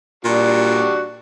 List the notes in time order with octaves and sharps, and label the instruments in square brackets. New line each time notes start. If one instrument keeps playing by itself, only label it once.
[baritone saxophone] A#2 [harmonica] G3 D4 F#4